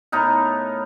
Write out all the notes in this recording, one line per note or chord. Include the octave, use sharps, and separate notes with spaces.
A2 B3 D#4 A#4